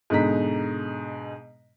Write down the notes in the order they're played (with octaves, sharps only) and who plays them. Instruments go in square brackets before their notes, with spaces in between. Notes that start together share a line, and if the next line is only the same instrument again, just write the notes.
[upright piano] G#2 B2 D3 D#4 A#5 B6